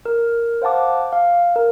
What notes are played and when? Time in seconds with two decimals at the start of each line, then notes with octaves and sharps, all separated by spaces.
0.05 A#4
0.62 C5 F5 F#5 A5 D6
1.13 F5
1.56 A#4